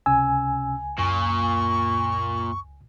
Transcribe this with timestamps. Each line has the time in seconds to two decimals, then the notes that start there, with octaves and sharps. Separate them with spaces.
0.06 C#2 C3 C#4 G#5 E6
0.98 F#2 A#2 C#6